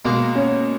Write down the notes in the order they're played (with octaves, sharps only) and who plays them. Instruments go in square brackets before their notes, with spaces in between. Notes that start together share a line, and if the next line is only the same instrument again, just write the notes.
[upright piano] B2 [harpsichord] G#3 A#3
[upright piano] C#4